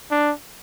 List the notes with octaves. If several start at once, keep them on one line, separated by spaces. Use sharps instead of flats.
D4